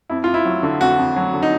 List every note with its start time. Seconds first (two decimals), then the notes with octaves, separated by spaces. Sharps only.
0.10 F2 E4
0.24 F4
0.28 F2
0.34 E4
0.45 F#3
0.63 D3
0.81 F2 F#4
0.99 F2
1.16 F#3
1.34 D3
1.43 D#4